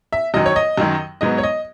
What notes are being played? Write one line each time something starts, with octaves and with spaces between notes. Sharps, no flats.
E5
F#2 D#3 F#3 D#5
C#5
D#5
F#2 D#3 F#3
G#2 F#3 B3 D#5
C#5
D#5